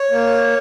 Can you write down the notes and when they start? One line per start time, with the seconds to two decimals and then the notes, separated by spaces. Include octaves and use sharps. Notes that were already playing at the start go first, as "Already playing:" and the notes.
Already playing: C#5
0.11 A#3